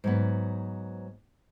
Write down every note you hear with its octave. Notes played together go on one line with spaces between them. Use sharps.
G#2 F#3 B3